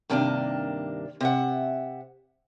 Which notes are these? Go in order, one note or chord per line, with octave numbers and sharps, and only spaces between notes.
G2 C3 D#3 A#3 C4 D4
C3 E5 F#5